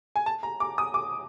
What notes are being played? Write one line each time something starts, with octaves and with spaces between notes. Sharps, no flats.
G#5
A5
A#5
D6
D#6
D6